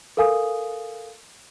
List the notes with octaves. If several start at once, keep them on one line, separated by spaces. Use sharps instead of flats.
A4 A#4 F5 G#5 D#6